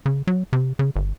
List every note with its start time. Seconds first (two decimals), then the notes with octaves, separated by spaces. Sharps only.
0.06 C#3
0.27 F#3
0.53 C3
0.79 C#3
0.96 G1